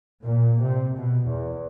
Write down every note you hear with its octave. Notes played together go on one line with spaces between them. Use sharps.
A#2
C3
B2
E2